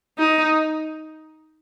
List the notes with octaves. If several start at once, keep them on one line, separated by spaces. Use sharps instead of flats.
D#4